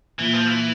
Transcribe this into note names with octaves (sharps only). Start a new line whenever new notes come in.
A#2 E3
F3
E3